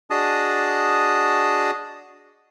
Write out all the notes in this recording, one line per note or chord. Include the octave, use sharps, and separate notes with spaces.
D4 F#4 G#4 D#5 A5 D#6